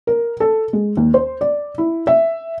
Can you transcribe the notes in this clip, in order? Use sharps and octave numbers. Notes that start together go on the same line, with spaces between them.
A#4
A4
G#3
D#2
C5
D5
E4
E5